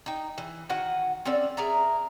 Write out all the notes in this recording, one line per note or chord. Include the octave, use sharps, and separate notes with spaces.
D#4 G5
E3
D#3 F#4 F#5 G#5
C4 C#4 A4 D5
G#4 A#4 E5 A#5